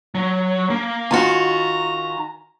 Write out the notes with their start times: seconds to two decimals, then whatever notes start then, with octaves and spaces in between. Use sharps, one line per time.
0.15 F#3
0.70 A#3
1.11 D#3 F4 F#4 G#5 A#5